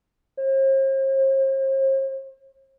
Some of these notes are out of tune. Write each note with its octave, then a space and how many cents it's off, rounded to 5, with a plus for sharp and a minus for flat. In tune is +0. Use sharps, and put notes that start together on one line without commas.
C5 +45